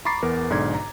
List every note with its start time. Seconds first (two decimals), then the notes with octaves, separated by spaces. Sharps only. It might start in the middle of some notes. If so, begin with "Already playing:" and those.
0.05 A#5 B5 C#6 D6 A6 C7
0.22 E2 B3 A#4
0.50 B1 G#2 D3 D5 G#6
0.74 A#5